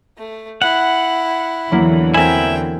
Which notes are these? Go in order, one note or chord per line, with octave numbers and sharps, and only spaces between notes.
A3
E4 F#5
E2 D3 E3 F#3 A#3 E4
C4 E4 A#4 E5 G5 G#5